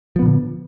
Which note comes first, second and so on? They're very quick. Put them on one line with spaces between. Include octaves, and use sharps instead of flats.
F3 B3 A#2 D3